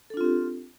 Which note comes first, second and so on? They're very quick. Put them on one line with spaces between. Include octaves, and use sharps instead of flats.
A4 D4 F4 C4 G4